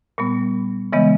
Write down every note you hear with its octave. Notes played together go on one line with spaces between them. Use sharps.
A#2 G3 B3
C#3 E3 G#3 B3 D#5